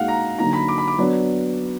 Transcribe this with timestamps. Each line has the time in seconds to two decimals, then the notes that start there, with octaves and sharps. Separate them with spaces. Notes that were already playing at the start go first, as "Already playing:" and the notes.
Already playing: A#2 G#3 D#4 F#4 F5 F#5
0.08 A#5
0.39 D3 F#3 A#3 D#4 A#5
0.53 B5
0.68 D6
0.78 B5
0.88 D6
0.98 F#3 B3 D4